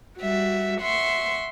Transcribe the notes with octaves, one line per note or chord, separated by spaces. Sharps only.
G3 F#4 E5
E5 F#5 C6 C#6